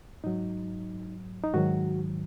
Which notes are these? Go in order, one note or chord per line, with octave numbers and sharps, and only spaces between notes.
G#2 F#3 D#4
D#4
G#2 D#3 F#3 F#4